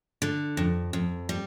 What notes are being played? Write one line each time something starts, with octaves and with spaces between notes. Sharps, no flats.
D3
F2
F2
G3